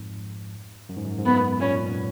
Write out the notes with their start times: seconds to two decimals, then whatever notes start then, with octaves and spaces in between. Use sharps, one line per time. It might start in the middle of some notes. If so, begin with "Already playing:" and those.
Already playing: F2 G#2
0.89 F#2
0.97 G#2
1.05 F#2
1.18 G#2
1.24 F#2 B3
1.59 F#2 A#2 C#4